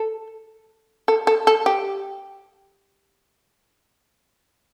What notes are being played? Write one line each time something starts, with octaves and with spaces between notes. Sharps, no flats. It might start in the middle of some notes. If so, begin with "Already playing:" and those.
Already playing: A4
A4
A4
A4
G4